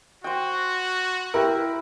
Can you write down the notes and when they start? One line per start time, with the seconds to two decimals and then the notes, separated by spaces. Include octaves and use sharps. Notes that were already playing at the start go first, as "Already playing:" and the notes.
0.24 F#4 C5 G5
1.34 E4 G4 A#4